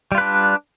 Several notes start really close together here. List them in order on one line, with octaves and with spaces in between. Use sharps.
G3 F4 B4 D4